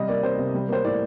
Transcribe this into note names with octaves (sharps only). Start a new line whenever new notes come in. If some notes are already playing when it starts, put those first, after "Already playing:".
Already playing: C3 G3 D#5
A#3 D5
C3 C5
C3
G3
A#3 C5
A2 D5